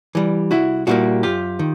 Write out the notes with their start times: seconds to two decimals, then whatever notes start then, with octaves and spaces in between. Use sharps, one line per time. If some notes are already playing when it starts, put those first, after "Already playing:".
0.15 E3 G3
0.51 C2 E4 F#4
0.87 A#2 G3 A#3 E4 F#4
1.23 F#2 F4 G4
1.59 D#3